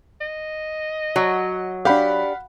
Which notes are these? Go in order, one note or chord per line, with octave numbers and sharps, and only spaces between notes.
D#5
F#3
D4 G4 F5 F#5 B5